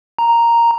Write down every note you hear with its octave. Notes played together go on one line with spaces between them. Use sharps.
A#5